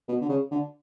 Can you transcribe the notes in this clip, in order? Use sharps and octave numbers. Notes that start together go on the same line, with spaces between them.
B2
D3
C#3
D3